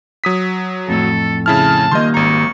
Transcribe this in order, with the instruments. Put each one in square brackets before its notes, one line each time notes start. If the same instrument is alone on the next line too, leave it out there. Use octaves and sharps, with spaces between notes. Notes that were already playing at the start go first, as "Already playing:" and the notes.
[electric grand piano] F#3 D#6 B6
[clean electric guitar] F2 A2 [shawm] A4
[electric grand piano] C#3 E4 F6 [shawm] A5
[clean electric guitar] D#3 G3 A#3 [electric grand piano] D#5 C6
[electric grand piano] G#1 A#5 [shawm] C#6